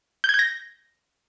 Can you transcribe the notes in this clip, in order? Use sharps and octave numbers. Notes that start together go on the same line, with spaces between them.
G6
G#6
G6
A#6